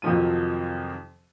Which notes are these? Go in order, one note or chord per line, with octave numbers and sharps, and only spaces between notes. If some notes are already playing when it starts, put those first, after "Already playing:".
F2 C3 D#3 F3 F#3 D#7